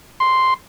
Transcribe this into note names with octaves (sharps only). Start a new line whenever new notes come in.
C6